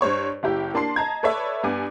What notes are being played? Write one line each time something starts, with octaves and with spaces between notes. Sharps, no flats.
G2 C5 C#5 C#6
F#1 E4 G4 G5
A#3 D4 A5 C6 C7
D#5 A5 A#5 G#6
A4 B4 C#5 D5 E5
G2 B3 G#5 D6